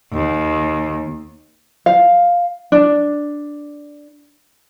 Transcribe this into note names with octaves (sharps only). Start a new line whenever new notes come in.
D#2
F5
D4